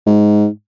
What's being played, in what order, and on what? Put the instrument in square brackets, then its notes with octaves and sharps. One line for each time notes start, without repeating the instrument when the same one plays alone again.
[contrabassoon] G#2